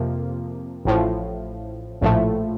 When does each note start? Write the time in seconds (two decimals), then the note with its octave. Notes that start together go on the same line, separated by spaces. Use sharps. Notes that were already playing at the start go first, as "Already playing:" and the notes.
Already playing: F2 C3 F3 A#3
0.85 A1 A2 F3
2.01 A#1 A2 F3 A3